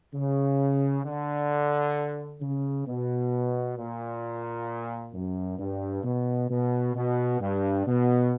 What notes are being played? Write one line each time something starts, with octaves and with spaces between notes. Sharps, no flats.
C#3
D3
C#3
B2
A#2
F#2
G2
B2
B2
B2
G2
B2